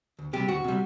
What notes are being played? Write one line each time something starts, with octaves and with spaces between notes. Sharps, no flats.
D2
C3 G3 G4
D2 F#4
C3 G3